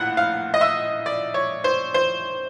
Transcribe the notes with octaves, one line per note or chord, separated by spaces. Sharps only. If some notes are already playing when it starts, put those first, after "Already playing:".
Already playing: A#1 A2 F#5
F5
D#5
E5
D5
C#5
C5
C5